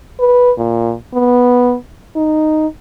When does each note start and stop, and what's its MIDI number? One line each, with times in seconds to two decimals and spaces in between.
0.20 0.51 71
0.58 0.94 46
1.14 1.75 59
2.16 2.67 63